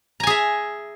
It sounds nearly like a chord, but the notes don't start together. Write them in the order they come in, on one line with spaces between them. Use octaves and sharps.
A#5 G#5 G#4 E5